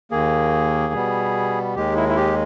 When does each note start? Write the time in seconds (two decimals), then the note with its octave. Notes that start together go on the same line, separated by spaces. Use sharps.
0.11 D#2 D#3 A#3 G#4
0.93 B2 G3 B3
1.76 D#2 D#3 G#3 G4
1.96 E4
2.09 E4
2.16 G4